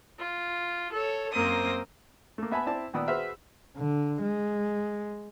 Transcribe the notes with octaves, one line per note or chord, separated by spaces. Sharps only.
F4
A4 C#5
F#2 A#3 C4 A#4 C5 D#6
A3 A#3
B3 E5 G#5 A5 B5
C4 E4 D5 E5 A5
A#2 D#3 B3 D5 D#6 E6
F#4 G#4 B4 C5 E5 F6
D3
G#3